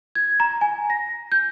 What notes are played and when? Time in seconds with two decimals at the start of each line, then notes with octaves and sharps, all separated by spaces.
0.15 G#6
0.40 A#5
0.61 G#5
0.90 A#6
1.32 G6